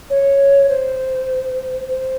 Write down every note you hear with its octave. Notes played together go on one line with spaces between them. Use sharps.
C#5
C5
C5